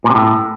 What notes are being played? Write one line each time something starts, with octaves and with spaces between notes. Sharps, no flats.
A#2
C3
A2